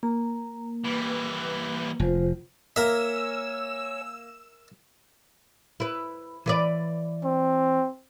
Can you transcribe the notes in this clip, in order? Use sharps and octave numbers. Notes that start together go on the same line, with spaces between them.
A#3 A#5
E3 G3 B4
F1 F4 C5
A#3 A#4 C#5 E5 G#5 E6
E4 B4
E3 B4 D5
C4